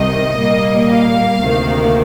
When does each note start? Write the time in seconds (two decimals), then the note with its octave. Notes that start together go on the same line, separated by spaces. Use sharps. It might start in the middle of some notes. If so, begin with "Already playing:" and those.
Already playing: C2 C3 D#3 G3 D#5
0.39 A#2 G3 A#3
0.91 F5
1.43 D2 C3 D#3 A#3